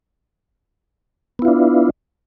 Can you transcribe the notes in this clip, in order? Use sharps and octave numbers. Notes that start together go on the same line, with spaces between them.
B3 D4 E4 F4